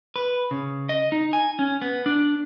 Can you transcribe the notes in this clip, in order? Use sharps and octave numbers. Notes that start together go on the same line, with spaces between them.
B4
C#3
D#5
D#4
G#5
C#4
B3
D4